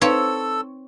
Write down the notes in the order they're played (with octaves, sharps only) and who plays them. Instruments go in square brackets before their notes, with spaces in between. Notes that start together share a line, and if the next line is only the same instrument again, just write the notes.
[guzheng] C4 C#5 [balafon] D#4 B4 F5 [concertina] A4 E6